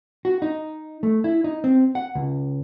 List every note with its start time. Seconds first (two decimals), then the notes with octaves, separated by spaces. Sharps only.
0.25 F#4
0.42 D#4
1.03 A3
1.24 E4
1.44 D#4
1.64 C4
1.95 F#5
2.15 C#2